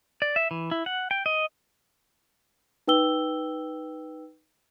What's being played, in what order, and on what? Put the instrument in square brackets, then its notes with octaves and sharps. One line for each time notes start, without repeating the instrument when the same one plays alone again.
[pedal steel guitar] D5
E5
E3
E4
F#5
G5
D#5
[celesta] D#4 B4 G5 E6 G7